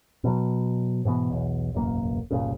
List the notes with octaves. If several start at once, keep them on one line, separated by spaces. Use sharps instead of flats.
B2 F#3
G#2 B2 E3 B3
B1 E2
E1 A1 F#2 A#3
G1 C2 A#2 C#3